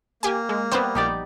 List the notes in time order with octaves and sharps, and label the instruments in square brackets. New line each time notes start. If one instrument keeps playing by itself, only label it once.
[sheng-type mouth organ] A#3 [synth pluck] G4 G#5
[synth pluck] G#3
[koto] G3 B3 [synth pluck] C4 B4 C5
[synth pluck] A#1 [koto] D#4 G4 D5